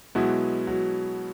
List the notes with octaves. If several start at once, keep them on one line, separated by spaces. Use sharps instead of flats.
B2 F#3 G#3 B3 E4
F#3